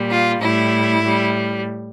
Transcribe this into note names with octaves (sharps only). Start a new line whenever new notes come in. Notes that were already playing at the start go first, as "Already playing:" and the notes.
Already playing: A#2 G3
F4
A2 G3 E4
A2 G3